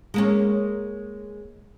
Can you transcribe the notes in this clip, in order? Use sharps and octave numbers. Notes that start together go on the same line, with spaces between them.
G#3 A#3 C#4